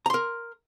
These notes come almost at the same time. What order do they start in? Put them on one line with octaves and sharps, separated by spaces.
A#5 C6 A#4